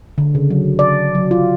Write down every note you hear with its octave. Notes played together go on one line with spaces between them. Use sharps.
D3
C#3
F#3
D5
F#3
F4